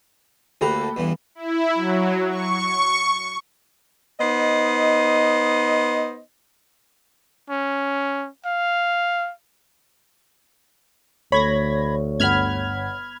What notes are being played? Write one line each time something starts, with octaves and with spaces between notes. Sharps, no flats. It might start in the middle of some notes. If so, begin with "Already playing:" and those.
D2 A#3 G4 A4 A#5 B5 F#6
E2 G2 E3
E4
F#3
C#6
B3 D#4 C5 D#5
C#4
F5
D2 A3 C#5 B5 G#6 A#6
G1 F#5 B5 F6 G#6